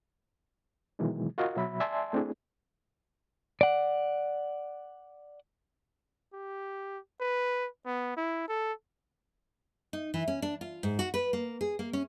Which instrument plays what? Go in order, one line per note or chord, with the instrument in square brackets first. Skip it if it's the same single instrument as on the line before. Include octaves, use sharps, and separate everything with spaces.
[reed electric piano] B2 D#3 E3 F#3 G#3
F4 F#4 A#4 D#5 F5
B2 F#3 E5 B5
D5 E5 G#5 A5 C6
A3 C4 D4 E4 G#4
[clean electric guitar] D5 F#5
[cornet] G4
B4
B3
E4
A4
[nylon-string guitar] D#4
E3
C#4
D4
F4
G#2
F#4
B4
A#3
G#4
A#3
C#4